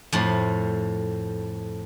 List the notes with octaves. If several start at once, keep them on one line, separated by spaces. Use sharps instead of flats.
F2 A2